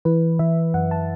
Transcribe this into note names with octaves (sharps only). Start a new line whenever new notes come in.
E3 B4
E3 E5
F#2 F#5
A5